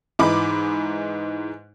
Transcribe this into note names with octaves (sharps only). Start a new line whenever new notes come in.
G#2 E3 D#4 B5 D6